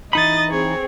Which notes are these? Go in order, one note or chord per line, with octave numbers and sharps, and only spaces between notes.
E3 D#4 D#5 B5 D#6 A6
C4 G#4 C#5